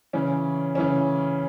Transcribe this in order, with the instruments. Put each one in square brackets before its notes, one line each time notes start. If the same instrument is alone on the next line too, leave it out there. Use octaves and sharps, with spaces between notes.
[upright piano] C#3 E3 C#4
C#3 E3 C#4